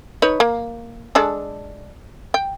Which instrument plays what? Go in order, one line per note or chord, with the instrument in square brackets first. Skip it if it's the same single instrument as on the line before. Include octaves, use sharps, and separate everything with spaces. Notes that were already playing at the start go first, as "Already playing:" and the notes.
[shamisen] D#4 B4 C#5
A#3
G#3 D4 A4
G5